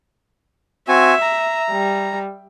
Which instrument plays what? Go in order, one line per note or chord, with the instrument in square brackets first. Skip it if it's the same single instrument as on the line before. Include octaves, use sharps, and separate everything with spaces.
[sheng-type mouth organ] C4 F#4 G#5 [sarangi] E5
[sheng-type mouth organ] A#5
[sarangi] G3